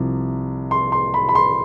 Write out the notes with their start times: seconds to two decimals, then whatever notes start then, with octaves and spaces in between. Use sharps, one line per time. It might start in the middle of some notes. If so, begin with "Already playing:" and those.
Already playing: C2 C3 F3
0.71 C6
0.92 C6
1.14 B5
1.29 B5
1.35 C6